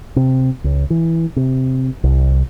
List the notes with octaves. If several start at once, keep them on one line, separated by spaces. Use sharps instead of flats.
C3
C#2
E3
C3
C2